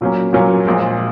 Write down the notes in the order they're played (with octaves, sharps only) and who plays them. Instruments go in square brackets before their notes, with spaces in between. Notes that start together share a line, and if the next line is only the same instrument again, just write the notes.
[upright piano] A#2 F#3 A#3 C#4
A#2 F#3 A#3 C#4
A#1 A#2 G#3